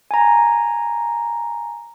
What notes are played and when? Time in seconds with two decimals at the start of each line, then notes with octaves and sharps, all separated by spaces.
0.11 G#5 A#5